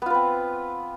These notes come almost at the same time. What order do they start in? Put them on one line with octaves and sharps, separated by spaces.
B3 F4 B4 C4